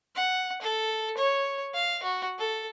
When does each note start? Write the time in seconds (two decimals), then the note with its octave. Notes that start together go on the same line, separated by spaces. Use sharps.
0.15 F#5
0.62 A4
1.18 C#5
1.74 F5
2.03 F#4
2.38 A4